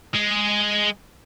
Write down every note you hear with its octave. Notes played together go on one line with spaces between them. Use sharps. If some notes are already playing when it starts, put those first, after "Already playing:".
G#3